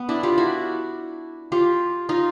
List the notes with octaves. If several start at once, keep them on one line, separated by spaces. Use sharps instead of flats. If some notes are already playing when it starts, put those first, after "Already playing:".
Already playing: B3
D4 E4
F4 G4
E4 F#4
F4 G4
D#4 F4